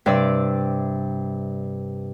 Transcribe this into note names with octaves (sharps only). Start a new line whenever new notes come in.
G2 C3 D5 E6